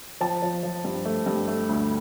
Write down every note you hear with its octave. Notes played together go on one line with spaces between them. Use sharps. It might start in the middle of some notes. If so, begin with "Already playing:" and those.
F3 A5
F3
F3
G2
A3
G2
A3
D2